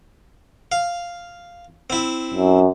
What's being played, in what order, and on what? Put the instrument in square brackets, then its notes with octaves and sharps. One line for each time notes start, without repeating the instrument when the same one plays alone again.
[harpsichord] F5
C4 E4
[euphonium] F#2